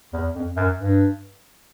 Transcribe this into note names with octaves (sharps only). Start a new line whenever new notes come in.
E2
F2
F#2
G2